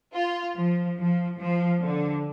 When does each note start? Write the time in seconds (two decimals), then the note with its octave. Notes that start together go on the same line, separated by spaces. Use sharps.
0.14 F4
0.56 F3
0.98 F3
1.39 F3
1.81 D3